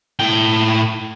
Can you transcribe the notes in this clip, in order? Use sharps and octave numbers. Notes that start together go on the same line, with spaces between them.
A2 G5